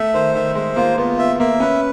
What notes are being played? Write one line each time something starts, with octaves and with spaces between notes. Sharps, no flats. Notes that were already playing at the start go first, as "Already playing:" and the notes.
Already playing: A3 E5
D#3 C5
D#3 E5
G#3 C5
A#3 F4
B3 F4
B3 E5
A#3 E5
C#4 B4